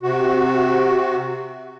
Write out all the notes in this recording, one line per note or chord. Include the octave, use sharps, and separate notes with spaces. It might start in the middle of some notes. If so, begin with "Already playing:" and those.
C3 F#4